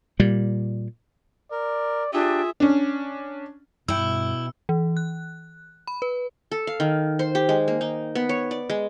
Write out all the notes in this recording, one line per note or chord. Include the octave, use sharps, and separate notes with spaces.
A#2 G3
A#4 D5
D4 F4 G4 G#4 E5
C#4 D4
G2 B2 E4 G5 E6
E3
F#6
B5
B4
A4
F5
D#3
C5
G4
G#3
A#3
D#4
B3
C#5
D5
G#3